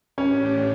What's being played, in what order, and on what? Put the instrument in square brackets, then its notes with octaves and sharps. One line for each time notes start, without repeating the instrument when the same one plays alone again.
[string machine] A2 E3 A3 D4 G4 [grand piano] C#4